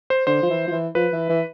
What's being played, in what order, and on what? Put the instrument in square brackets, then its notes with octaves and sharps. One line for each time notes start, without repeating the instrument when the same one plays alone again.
[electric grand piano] C5
[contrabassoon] D3 [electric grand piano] C5
[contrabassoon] F3
E3
F3
E3
[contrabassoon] F3 [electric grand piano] B4
[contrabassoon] E3
E3